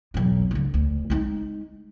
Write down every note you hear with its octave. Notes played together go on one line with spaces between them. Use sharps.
B1 E2
C#2 D3
D2
G#3 D#4